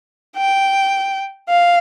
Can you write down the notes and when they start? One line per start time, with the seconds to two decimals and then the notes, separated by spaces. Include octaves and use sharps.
0.37 G5
1.49 F5